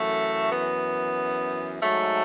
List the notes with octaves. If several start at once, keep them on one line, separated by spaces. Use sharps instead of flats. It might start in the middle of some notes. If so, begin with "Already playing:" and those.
Already playing: F#2 E3 A3
B3
G#2 F#3 A3